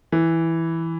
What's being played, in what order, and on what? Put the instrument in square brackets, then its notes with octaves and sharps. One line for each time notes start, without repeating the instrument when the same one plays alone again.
[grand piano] E3